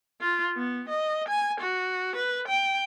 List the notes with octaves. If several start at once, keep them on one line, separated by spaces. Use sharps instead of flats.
F4
B3
D#5
G#5
F#4
B4
G5